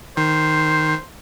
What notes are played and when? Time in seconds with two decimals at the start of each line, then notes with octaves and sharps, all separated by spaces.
0.17 D#3 C5